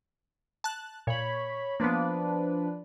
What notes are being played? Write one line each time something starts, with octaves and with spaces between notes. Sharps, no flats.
A5 F#6
A#2 C#5 B5
F3 A#3 B3 D4 B4